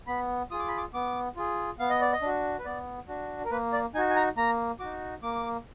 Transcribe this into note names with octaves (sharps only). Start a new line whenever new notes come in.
B3 B5
F4 G#4 D#6
D6
B5
D6
B3 D6
F4 G#4
B3 F5
D#5
D5
D#5
D4 F#4
B4
B3 D5
D4 F#4
A#4
A#3 B4
D5
D#4 F#4 G#5
G#5
A#5
A#3 A#5
D#4 F#4 D6
A#3 D6